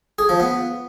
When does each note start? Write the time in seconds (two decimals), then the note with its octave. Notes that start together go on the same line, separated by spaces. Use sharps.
0.19 G#4
0.29 F3
0.40 B3